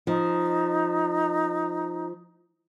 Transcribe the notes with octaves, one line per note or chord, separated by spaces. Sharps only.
F3 D#4